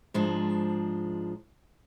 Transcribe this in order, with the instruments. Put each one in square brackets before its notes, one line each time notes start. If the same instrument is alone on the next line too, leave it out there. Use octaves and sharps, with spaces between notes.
[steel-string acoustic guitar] G#2 F3 G#3 D4